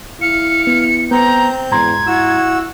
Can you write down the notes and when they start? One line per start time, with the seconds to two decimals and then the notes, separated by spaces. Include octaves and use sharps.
0.21 E4 F5 C#7
0.67 B3
1.11 B3 C4 A#5 G6
1.71 E2 G#2 A#5 C6 G#6
2.07 E4 F#4 E6